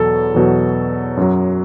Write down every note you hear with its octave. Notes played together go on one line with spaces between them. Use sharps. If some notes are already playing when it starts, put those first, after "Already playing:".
Already playing: E2 B2 F#3 A4
E2 B2 F#3
F#2 F#3